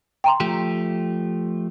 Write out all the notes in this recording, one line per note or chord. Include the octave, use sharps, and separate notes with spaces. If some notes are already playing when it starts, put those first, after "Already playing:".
G5 A#5 C6
F3 A3 G4